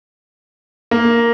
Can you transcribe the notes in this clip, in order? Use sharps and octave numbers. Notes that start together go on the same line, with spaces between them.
A#3